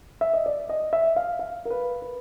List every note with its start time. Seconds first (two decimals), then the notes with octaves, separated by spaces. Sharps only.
0.21 E5
0.33 D#5
0.46 D5
0.69 D#5
0.93 E5
1.16 F5
1.39 F5
1.65 A#4
1.70 B4
2.02 B4